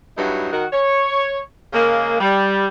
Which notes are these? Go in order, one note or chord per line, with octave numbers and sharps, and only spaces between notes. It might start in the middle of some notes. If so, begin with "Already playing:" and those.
G2 F#3 D#4 E4 F#4
D#3 F#4
C#5
C#3 G#3 A#3
G3